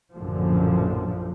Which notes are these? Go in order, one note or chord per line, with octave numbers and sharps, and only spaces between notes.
A#1 F#2 A2 D3 F3